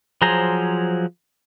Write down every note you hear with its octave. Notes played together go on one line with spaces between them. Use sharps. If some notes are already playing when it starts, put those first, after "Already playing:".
F3 F#3 G#4 C5 A#5